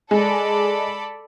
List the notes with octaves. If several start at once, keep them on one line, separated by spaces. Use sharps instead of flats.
G#3 A4 D5 B5